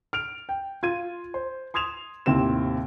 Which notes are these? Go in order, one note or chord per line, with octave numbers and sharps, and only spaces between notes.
F6 D7 F7
G5
F4 G#6 D#7
C5
C6 D#6 G#6 E7 F7
D#2 A2 C3 C4 G4 E7